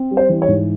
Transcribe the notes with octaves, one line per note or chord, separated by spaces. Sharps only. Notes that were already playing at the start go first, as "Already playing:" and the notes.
Already playing: C4
G3
C5
E3
C#5
G#2